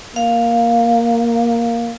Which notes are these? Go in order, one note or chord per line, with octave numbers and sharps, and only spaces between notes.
A#3 F5